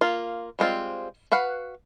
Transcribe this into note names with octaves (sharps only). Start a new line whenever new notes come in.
A#3 F4
G3 G#3 C4 F4
F#4 B4 F5 F#5